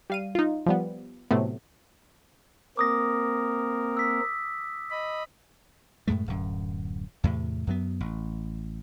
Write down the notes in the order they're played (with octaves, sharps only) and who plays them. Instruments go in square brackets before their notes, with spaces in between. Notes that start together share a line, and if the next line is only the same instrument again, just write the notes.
[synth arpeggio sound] G3 F5 D#7
D#4 F4
F3 G3 B3
A2 C3 F#3 A3 B3
[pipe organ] A#3 C4 A#4 [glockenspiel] D6 D#6 A#6
[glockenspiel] E6 B6
[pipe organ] D#5 B5
[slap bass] F#2 A2 G#3 A3
D1 F#2
E2 A2 C3
F#2 F#3 B3
A1